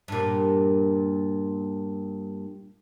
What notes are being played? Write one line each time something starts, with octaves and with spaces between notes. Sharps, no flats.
G2 A#2